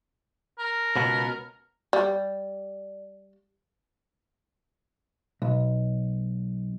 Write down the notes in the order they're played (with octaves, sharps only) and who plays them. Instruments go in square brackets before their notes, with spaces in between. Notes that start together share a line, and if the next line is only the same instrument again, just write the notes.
[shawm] A#4 [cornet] A#5
[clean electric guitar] C#2 B2 B3
[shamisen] G3 [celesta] D5
[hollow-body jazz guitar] B1